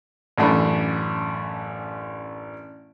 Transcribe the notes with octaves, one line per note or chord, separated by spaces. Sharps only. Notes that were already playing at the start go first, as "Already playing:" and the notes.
A1 F#2 A3 D4 B5